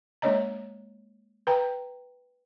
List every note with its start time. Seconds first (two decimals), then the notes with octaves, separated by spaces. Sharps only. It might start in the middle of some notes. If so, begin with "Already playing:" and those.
0.22 G#3 A#3 D4 C#5 D#5 A#5
1.47 B4 G5 A#5